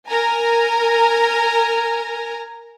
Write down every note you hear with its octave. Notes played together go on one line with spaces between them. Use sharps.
A#4 G#5 A#5